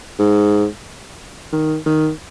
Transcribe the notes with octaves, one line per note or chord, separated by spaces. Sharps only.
G#2
D#3
D#3